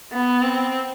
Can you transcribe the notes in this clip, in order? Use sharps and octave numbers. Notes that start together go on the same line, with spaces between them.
B3
C4